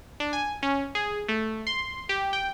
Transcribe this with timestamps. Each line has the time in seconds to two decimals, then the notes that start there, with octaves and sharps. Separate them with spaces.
0.20 D4
0.33 G#5
0.63 C#4
0.95 G#4
1.29 A3
1.67 C6
2.09 G4
2.33 G5